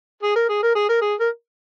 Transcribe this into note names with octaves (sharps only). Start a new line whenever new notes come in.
G#4
A#4
G#4
A#4
G#4
A#4
G#4
A#4